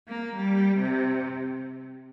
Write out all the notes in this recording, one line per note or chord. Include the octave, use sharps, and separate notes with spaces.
A#3
G3
C3